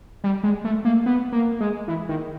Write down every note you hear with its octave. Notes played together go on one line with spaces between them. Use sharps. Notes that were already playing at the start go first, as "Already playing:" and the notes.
G3
G#3
A3
A#3
B3
A#3
G#3
E3
D#3